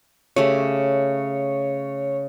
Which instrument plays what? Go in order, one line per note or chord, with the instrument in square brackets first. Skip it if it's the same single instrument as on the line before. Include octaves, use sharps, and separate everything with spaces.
[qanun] C#3 A3 G4 [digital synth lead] C#5